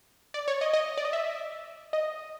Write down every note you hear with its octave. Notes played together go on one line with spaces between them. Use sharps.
D5
C#5
D#5
D#5
D5
D#5
E5
D#5